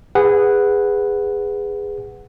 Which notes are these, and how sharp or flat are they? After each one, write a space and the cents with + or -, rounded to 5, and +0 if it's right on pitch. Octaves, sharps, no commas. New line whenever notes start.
G#4 -15 B4 +5 F#5 +0